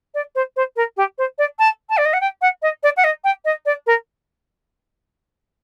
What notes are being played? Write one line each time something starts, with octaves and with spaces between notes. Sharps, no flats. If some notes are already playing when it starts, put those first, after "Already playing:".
D5
C5
C5
A#4
G4
C5
D5
A5
A5
D5
D#5
F#5
G5
F#5
D#5
D5
F#5
D#5
G5
D#5
D5
A#4